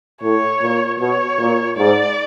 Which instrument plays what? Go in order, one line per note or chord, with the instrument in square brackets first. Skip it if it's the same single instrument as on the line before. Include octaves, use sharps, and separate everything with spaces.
[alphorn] A2 [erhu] C#5
[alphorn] A#2
[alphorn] B2 [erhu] C#5
[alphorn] A#2
[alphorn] G#2 [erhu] D5